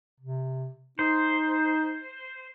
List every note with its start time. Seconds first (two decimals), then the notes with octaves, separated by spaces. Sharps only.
0.20 C3
0.99 D#4 C5